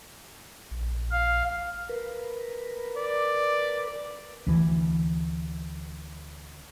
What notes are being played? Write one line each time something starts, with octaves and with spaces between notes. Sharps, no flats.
A#1
F5
A#4 B4
D5
D2 E3